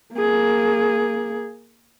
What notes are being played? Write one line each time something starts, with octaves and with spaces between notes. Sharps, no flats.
A#3 G#4